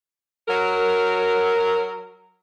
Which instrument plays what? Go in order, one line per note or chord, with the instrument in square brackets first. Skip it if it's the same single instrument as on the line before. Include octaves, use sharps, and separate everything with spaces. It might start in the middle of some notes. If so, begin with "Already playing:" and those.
[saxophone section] F#3 A#4